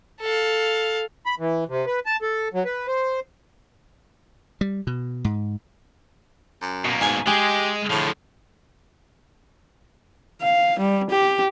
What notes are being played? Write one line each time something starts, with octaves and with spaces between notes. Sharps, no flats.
A4 F5
B5
E3
C3
B4
A5
A4
F#3
B4
C5
G3
B2
G#2
F#2
B2 A#3
G#2 G#5
G#3 G4 G#4
A2 D3 F3
F5
G3
G4